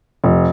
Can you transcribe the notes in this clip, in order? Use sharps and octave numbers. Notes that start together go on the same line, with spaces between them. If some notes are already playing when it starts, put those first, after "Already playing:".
F1